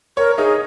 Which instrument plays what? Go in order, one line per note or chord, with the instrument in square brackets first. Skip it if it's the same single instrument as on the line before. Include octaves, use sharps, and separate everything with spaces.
[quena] A#4 [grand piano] C#5
[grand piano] D#4 [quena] G#4